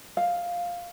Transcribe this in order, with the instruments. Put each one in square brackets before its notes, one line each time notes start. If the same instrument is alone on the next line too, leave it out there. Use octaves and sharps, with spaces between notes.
[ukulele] F5